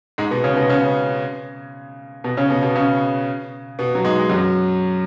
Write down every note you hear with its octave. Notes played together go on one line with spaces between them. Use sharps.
G#2 G#3
B2 B3
C#3 C#4
B2 B3
C#3 C#4
B2 B3
C#3 C#4
B2 B3
B2 B3
C#3 C#4
B2 B3
F#3
G#2 G#3
G#3
F#2 F#3